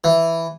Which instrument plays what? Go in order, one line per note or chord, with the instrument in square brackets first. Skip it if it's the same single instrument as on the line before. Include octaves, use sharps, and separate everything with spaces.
[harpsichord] E3